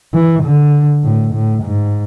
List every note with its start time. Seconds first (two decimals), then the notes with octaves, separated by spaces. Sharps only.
0.14 E3
0.44 D3
1.04 A2
1.33 A2
1.63 G#2